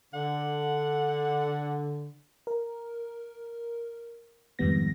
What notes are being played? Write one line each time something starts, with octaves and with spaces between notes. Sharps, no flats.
D3 F#5
A#4
F2 G#2 D#3 G3 B3 A#6